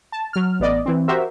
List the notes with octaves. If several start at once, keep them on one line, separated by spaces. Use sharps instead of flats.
A5
F#3 F6
A1 B3 D5 D#5
E3 C4
F#4 G4 A#4 C5 E5